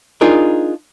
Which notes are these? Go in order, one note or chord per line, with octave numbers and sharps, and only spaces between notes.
D4 D#4 F4 G#4 A#4